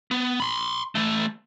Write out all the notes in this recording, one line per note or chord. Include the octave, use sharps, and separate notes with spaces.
B3
B5 C6
E3 A3